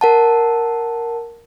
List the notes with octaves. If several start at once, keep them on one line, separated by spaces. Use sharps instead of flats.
A#4 F#5 A5